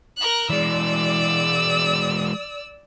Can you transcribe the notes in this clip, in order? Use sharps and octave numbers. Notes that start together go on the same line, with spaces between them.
A#4 F#6
E3 G#3 D5 E6